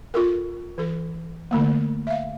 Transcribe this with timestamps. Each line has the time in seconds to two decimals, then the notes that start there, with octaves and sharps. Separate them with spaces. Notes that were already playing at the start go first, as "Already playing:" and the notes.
0.14 F4 A4 A#4
0.78 E3 A4
1.51 D3 A3 A#3
2.07 E5 F5